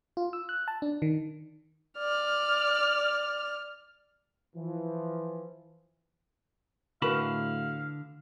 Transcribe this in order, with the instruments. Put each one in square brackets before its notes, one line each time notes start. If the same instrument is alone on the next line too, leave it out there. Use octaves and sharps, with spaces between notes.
[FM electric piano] F4
E6
F#6
A5
D4
D#3
[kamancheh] D5 F6
[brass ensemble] E3 F3
[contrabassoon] A2 [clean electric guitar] D3 A5 B5 [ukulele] F#4 A#4 B4 [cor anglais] F5